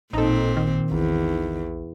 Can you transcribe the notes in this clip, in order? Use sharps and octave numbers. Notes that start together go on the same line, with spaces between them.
A1 A#2 C4 D#4 A4
D#3
A#1 E2